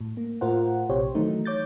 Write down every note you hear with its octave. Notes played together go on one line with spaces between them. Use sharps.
A2
A#3
A2 F4 A#4 C5 F#5
A#1 C3 G4 C5 C#5
D#3 E3 F#3 A3 D#4
C#5 D6 G6 A6